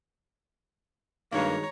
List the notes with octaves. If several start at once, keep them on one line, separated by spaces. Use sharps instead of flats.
G2 D#3 G#3 A#3 F#4 C#5 A#5